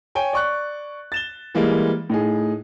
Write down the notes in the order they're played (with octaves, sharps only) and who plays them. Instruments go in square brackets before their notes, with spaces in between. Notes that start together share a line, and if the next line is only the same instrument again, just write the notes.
[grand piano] C#5 G5 G#5
D5 C#6 F#6
A6 E7 G7
E3 G3 G#3 A#3
A2 D#4 G#4